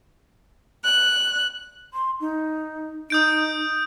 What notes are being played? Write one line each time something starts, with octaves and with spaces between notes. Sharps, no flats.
F#6
C6
D#4
D#4 D#6 G6 D7